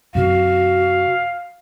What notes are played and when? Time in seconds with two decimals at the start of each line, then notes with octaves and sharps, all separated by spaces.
0.15 F#2 C3 F#4 F5